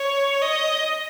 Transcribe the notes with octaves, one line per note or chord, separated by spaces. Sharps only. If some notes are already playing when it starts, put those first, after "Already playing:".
Already playing: C#5
D#5